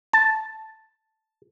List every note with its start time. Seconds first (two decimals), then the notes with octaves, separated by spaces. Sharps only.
0.13 A5